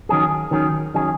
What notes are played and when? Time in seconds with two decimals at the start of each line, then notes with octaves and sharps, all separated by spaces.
0.09 D#3 F#3 C#4 G#4
0.51 D#3 F#3 C#4 G#4
0.94 D#3 F#3 C#4 G#4